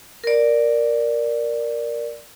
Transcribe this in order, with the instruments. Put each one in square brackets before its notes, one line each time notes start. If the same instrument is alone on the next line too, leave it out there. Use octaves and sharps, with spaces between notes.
[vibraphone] A#4 D5